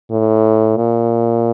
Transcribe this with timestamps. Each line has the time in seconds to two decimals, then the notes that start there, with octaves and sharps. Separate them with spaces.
0.11 A2
0.77 A#2